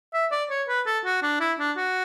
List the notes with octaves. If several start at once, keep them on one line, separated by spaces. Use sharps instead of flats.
E5
D5
C#5
B4
A4
F#4
D4
E4
D4
F#4